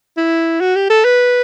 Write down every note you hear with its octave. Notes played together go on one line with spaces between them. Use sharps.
E4
F#4
G4
A4
B4